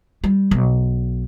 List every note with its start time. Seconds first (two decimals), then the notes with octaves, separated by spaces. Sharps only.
0.24 G3
0.51 B1